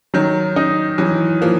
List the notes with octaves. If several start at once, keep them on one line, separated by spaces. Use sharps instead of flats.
D#3 F#3
D#4
E3 F#3
F3 A#3